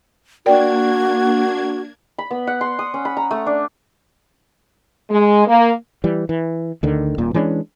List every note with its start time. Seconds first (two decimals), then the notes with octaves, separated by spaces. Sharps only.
0.46 A#3 D4 F#4 A#4 D5 G5 G#6
2.18 B5
2.31 B3
2.47 F#5
2.61 C6
2.79 D#6
2.94 C#4
3.05 B5
3.17 A#5
3.31 A3
3.46 D4
5.10 G#3
5.47 A#3
6.04 E3 G3
6.29 E3
6.83 D2 D3 D#3
7.18 D#1 A#2
7.34 E3 G#3 C#4 D4